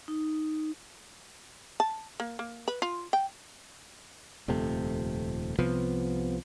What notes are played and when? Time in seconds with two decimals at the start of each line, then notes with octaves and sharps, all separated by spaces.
0.08 D#4
1.80 A5
2.20 A#3
2.39 A#3
2.68 B4
2.82 F4
3.13 G5
4.48 D#1 F2 C3 A3
5.58 C2 C3 F3 B3